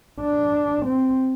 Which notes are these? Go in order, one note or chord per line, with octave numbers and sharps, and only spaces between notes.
D4
C4